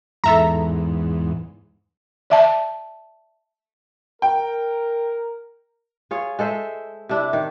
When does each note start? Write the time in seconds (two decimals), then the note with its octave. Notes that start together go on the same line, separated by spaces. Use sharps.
0.24 E2 G#2 A4 E5 A#5
2.30 D5 E5 A5
4.22 A#4 G5
6.11 F4 G#4 C#5
6.39 G#3 A4 C5 E5
7.09 C3 D4 E4
7.33 D#3